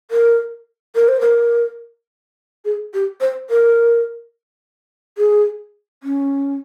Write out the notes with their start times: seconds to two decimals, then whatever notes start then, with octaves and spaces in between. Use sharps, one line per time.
0.11 A#4
0.95 A#4
1.08 C5
1.21 A#4
2.65 G#4
2.94 G4
3.21 C5
3.50 A#4
5.18 G#4
6.03 C#4